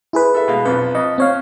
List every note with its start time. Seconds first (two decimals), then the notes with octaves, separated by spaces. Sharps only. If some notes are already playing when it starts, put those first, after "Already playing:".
0.13 E4 G#4 B4
0.34 A4 E5
0.48 B2 G#3 F5
0.65 B1 F2 B4
0.95 F2 D#5
1.18 C4 C#5 F5